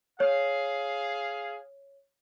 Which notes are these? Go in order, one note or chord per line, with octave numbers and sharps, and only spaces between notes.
G#4 C#5 F5